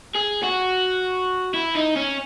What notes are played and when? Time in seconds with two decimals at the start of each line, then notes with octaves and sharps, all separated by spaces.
0.15 G#4
0.43 F#4
1.54 E4
1.75 D#4
1.96 C#4